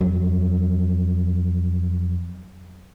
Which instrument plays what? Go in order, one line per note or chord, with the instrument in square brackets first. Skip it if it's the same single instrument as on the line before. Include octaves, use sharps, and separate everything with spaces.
[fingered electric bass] F2 F#3